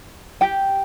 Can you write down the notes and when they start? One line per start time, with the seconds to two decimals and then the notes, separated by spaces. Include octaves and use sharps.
0.41 G4 G5